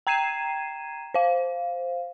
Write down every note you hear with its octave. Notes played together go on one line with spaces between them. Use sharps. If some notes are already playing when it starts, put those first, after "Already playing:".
G5 A#5 G#6 C7 D#7 E7
C5 F5